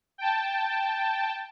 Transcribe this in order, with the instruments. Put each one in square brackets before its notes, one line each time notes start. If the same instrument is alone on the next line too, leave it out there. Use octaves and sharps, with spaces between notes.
[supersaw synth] G5 A5